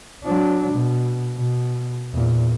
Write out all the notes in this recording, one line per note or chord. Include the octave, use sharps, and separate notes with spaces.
F#3 D4
B2
B2
E2 A#2